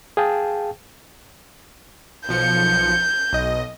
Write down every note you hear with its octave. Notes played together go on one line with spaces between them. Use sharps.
G#4 F5 G5 A5
B1 F3 G6 C#7
B1 D#5